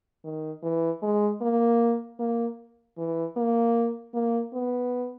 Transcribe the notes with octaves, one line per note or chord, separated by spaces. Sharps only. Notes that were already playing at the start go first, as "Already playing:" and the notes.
D#3
E3
G#3
A#3
A#3
E3
A#3
A#3
B3